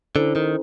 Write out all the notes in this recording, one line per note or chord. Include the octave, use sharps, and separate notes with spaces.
D3 C#4 E4 A4 C5
D#3